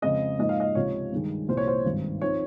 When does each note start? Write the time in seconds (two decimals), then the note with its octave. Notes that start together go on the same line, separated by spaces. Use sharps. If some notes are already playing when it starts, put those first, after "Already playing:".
0.02 F2 C#3 G#3 C4 D#5
0.39 G#2 F3 A#3 D#4 D#5
0.49 F5
0.60 D#5
0.75 C#2 C3 F3 C#5
1.12 G2 D#3 G#3
1.48 C2 A#2 F3 C5
1.57 C#5
1.68 C5
1.85 G#1 G2 D#3
2.21 F3 C4 D#4 C#5